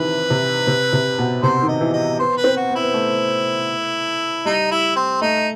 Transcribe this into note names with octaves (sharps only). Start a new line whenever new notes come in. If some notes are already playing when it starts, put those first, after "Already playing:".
Already playing: C3 D#3 E3 B4
C3
C3
C3
B2
C3 C5
D#3
D#5
E3
D#5
B3 C5
B4
C4
F#4
B3
E4
B3
A3
G3 D#4
E4
C4
A3 D#4